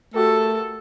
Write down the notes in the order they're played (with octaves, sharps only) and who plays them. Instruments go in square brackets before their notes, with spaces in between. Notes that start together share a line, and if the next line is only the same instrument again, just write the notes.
[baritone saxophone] A3 [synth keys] F#4 G4 A#4 [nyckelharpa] A4